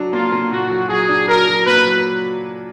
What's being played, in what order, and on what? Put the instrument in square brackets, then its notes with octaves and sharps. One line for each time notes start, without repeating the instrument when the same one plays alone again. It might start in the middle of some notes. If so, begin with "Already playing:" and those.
Already playing: [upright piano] F#3 D4
[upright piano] A#3 [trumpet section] F4
[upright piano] A#3
[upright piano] A#2 [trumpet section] F#4
[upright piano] F#3
[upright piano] F#3 [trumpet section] G#4
[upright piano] D4
[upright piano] F#3 [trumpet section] A#4
[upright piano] F#3
[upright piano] A#3 [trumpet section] B4
[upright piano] F#3